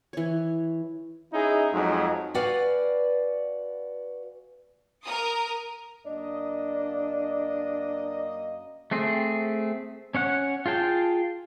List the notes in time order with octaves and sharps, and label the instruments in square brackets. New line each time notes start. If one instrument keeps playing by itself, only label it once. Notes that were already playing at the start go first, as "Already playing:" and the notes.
[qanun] E3 C#5
[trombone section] C#4 D#4 E4 G#4
F2 F#3 G#3 D#4
[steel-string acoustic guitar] F#4 B4 D5 F5 F#5 G#5
[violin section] A#4 D#6
[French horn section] F#2 A#3 D#5 [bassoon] D4
[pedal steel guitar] A3 C4 G#4
C#4 C#5 F#5
F4 G#4 G5 A5